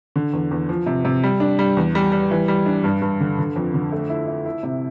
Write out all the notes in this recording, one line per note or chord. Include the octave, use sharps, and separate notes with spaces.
D3
E2
E2
F3
C3
C3
G3
D4
G3
E2
G3
G3
E3
G3
D4
G2
G2
D3
D3
F2
D3
A3
E4
E4
E4
C3